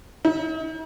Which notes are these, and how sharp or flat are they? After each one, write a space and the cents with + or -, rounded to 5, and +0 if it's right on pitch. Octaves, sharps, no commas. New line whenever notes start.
D#4 +45